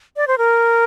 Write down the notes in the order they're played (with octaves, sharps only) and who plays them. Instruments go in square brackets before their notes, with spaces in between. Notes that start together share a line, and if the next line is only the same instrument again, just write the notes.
[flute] D5
C5
A#4